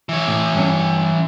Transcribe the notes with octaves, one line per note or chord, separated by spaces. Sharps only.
E3 C#5
A2
G2 C#4